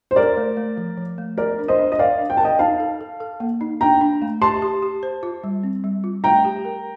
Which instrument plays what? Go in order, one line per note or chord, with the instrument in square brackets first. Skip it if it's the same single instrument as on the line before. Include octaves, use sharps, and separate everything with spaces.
[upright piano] C5
[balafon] A4 [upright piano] A#4 D5
[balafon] A3
A3
F3
F3
A3
[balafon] F4 [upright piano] A#4 D5
[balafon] D4
[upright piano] C5 D#5
[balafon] D4
[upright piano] D#5
[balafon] A#4 [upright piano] D5 F5
[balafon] D4
[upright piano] G5
[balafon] A#4 [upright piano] A5
[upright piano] D#5 G5
[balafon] D#4 [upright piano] F5 A5
[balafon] A4
A4
A4
A#3
D#4
[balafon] D4 [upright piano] G5 A#5
[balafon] D4
A3
[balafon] G4 [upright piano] A5 C6
[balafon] G4
G4
C5
F4
G3
C4
G3
F4
[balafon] A3 [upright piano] G5 A#5
[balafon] G4
A#4